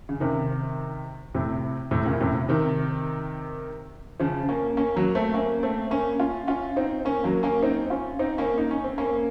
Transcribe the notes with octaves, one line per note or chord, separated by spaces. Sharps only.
C#3
C3 D#3
A2 C3
A2 C3
A#2 C#3
A2 C3
C3 D#3
C#3 F3
A#3 C#4
A#3 C#4
F#3 A#3
A3 C4
A#3 C#4
A3 C4
A#3 C#4
C#4 F4
C#4 F4
C4 D#4
A#3 C#4
F#3 A#3
A#3 C#4
C4 D#4
C#4 F4
C4 D#4
A#3 C#4
D#4
C#4
C4
A#3 C#4